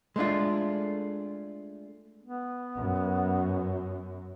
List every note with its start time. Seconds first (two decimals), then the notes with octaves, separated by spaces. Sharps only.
0.16 G#3 A3 D4 F4
2.23 B3
2.76 F#2